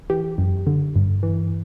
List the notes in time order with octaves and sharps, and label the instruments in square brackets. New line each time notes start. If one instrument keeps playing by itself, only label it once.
[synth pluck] E3 G4
F#2
D3
G2
E3